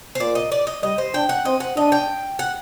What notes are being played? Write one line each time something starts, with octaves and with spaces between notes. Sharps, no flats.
C5
A#2 D5
D#5
D5
D#5
G3 D#5
C5
D4 G5
F#5
C4 D#5
F#5
D4 D#5
G5
F#5